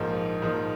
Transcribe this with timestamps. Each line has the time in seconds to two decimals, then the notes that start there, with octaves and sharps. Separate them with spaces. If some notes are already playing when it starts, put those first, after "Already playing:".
Already playing: A#1 G#2 F3 A#3 D#4
0.42 A#1 G#2 F3 A#3 D#4